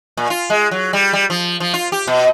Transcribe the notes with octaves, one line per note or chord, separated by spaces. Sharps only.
A#2
F4
G#3
F#3
G3
G3
F3
F3
F4
G4
B2